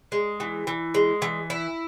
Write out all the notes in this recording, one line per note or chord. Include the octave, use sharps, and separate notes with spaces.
G#3
E3
E3
G#3
E3
E4